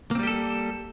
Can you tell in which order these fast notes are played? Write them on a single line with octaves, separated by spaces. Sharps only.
A#3 C4 G3 G4 A4